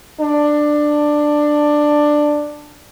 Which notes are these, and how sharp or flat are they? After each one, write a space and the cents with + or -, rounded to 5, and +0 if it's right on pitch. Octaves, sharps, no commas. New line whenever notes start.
D4 +10